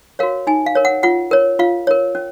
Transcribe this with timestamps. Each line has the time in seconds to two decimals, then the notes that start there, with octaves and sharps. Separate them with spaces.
0.19 F#4 A#4 C#5 F5
0.47 D#4 G#5
0.66 F5
0.75 A#4 C#5
0.85 F#5
1.03 F4 F#5
1.31 A#4 C#5
1.59 F4 F5
1.87 A#4 C#5
2.15 C#4